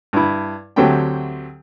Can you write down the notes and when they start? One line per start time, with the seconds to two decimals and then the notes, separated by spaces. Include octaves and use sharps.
0.13 G2 E4
0.76 D2 F#3 A3 C4 G4 G5